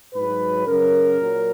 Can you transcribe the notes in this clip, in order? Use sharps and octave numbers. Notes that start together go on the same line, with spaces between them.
G#2 F#3 B4
F#2 C#3 F#3 A#4
A#2 F#3